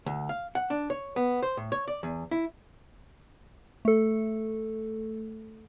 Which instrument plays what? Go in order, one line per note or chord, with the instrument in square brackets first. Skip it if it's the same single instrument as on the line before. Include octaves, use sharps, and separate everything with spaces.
[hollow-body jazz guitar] D2
F5
F#5
D4
C#5
B3
C5
A2
C#5
D5
E2
E4
[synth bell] A3 A4